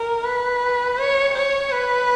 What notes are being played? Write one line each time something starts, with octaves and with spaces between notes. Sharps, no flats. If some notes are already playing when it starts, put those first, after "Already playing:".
Already playing: A#4
B4
C#5
C#5
B4